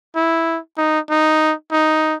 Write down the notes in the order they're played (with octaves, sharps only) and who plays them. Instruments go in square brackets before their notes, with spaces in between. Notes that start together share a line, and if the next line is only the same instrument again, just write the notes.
[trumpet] E4
D#4
D#4
D#4